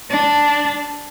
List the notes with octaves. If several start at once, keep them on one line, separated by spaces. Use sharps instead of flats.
D4